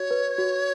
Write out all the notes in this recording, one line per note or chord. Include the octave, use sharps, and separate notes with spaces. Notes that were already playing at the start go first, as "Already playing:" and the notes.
Already playing: F#4 C#5
B4
F#4